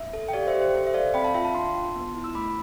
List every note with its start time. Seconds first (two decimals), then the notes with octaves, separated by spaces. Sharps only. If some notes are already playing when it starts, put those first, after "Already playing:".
Already playing: E5
0.13 A4
0.28 G5
0.33 G4 D5 F5
0.47 C5 E5
0.54 G4
0.61 C5
0.74 A4 C5
0.87 E5
0.94 A4 D5 F5
1.14 C4 G5 B5
1.24 F5 A5
1.34 F4 E5 G5
1.44 F5 A5
1.55 D4 A5 C6
1.75 F4
1.96 B3
2.15 E4
2.24 E6
2.35 A3 B5 D6